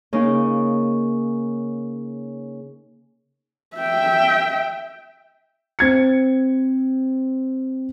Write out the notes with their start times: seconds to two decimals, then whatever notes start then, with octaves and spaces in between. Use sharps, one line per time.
0.13 C#3 A#3 D#4
3.77 E5 G5
5.79 C4 G#6 C#7